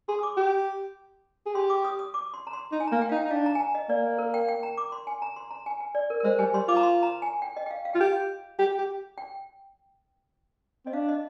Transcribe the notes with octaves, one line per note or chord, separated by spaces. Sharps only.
G#4 C6
D#6
D6
G4
G#4
G4 C6
D6
D#6
D#6
D6
C6
A#5
C6
D#4 C6
G#5
A#3 A#5
G5
D#4 F5
G5
D#4
D4 F5
A#5
G#5
A#5
D#5
A#3 D5
A#4
G5
G5
A#5
D6
C6
G#5
A#5
C6
A#5
G#5
G#5
D5
A#4
A#4
G#3 C5
G3 G#5
G3 C6
F4 D6
A#5
C6
A#5
G#5
G5
D#5
G5
F5
F5
F4 G5
G4 F5
G4
G4
G5
C4 D#5
D4 F5
D#5